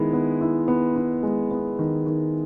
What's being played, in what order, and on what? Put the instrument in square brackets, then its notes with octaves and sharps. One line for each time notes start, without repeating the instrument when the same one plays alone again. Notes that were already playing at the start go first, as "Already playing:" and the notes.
Already playing: [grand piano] D#3 G#3 B3 E4
B3
E4
B3
E4
G#3
B3
D#3
D#3